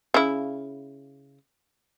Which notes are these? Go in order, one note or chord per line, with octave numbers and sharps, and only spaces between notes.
C#3 E4